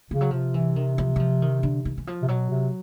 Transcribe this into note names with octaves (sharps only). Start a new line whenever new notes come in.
C#3 F3
F#3
C3 F3
E3
D#3
F3
F#3
F3
D#3
D3
D#3
E3
F3
C3
B2 F#3
C3